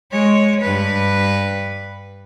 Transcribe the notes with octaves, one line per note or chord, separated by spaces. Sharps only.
G#3 C#5
G2 B4